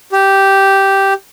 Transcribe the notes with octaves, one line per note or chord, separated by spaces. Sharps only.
G4